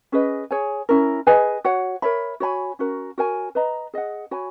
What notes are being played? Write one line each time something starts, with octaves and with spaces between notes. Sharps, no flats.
C#4 G#4 B4 D#5
G#4 C#5 G#5
C#4 E4 A#4
G#4 B4 D#5 G#5
F#4 C#5 F#5
A#4 C#5 E5 B5
F#4 C#5 G#5 B5
C#4 F#4 A#4
F#4 A#4 C#5 G#5
B4 D#5 A#5
G#4 D#5 F#5
F#4 C#5 G#5 B5